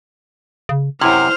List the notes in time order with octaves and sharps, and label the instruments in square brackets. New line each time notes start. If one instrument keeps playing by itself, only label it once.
[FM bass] C#3
[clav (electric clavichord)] F#2 C3 [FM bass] E4 [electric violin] C5 F6